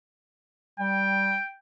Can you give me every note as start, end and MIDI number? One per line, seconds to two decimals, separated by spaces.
0.80 1.36 55
0.80 1.54 79